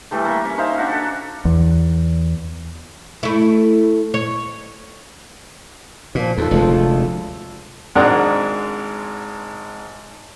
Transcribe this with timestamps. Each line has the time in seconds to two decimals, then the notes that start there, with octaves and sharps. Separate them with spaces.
0.11 E3 G3 A3
0.25 A#3 E5
0.45 C#4
0.58 D#4 C5 E5 F5
0.78 C#4 D4 F#4
0.92 A4
1.45 E2
3.23 A3 E4
4.14 C#5
6.15 A#2 F3
6.38 D#2 F4 A4
6.51 F1 D2 G#3
7.95 G#1 G#2 G#3 D4 A#4 F#5